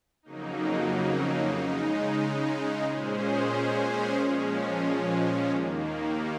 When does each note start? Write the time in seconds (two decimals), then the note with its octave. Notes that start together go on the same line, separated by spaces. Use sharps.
0.23 F2 C#3 F#3 A#3 D#4
1.54 C#3 G#3 D#4
2.86 A#2 G#3 C#4 G#4 C5
4.17 A#2 F3 G#3 C#4
5.49 D#2 D#3 A#3